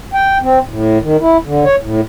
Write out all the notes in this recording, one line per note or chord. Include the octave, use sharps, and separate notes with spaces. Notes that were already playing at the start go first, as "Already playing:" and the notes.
G5
C4
A2
D#3
E4
D3
C#5
A2